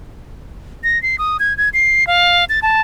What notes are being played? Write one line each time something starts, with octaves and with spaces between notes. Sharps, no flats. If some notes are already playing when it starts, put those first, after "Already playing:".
A#6
C7
D#6
G#6
G#6
C7
F5
A6
A5